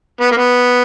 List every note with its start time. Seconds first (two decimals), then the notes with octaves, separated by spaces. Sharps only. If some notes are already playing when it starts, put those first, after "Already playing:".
0.21 B3
0.31 A#3
0.37 B3